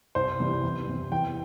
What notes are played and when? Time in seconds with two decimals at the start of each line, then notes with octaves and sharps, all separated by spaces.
0.15 C2 C5
0.40 C3 E3 G3
0.63 E2
0.88 C3 E3
1.12 E2 G5